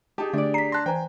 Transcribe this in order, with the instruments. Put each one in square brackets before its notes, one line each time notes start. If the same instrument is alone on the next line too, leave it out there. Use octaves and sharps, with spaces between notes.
[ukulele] D#4 A5 [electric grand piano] G4 G#4
[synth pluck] D3 A3 [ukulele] D4 D5
[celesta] A#5 B6 [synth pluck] C7
[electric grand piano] A5 C6 [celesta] F#6 A#6
[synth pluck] E3 [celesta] C5 A#5 [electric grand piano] G5 G#5